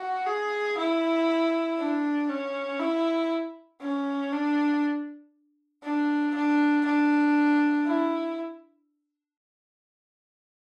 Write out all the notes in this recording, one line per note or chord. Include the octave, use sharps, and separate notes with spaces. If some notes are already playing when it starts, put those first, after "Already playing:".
Already playing: F#4
G#4
E4
D4
C#4
E4
C#4
D4
D4
D4
D4
E4